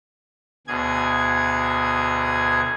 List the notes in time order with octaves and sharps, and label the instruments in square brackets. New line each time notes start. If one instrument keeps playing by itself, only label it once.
[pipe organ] D2 B2 G#4 G#6